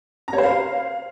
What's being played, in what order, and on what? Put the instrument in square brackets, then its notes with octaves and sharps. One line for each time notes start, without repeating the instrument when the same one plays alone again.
[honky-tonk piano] A#5
C#5
C5
F5